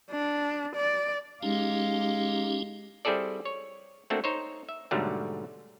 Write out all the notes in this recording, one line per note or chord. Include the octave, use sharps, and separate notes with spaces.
D4
D5
G#3 C#4 D#4 G4 F5
G3 C4 E4 G#4 A4 D5
C#5
A3 A#3 C4 D4 F#4 A4
D#4 C5 C#5
E5
G#2 B2 D3 F#3 G3 A3